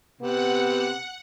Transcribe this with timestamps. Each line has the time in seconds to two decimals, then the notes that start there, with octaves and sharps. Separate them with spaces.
0.21 C3 B3 F#5